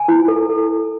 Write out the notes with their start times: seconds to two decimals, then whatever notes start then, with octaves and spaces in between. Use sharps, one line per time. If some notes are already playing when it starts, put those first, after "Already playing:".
Already playing: G#5
0.08 E4
0.28 A4
0.49 A4